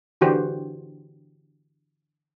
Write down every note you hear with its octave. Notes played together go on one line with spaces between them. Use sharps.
D3 E3 F#4 G4 C5